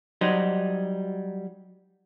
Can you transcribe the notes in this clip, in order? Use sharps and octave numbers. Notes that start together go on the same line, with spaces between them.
F#3 G3 D#4 C5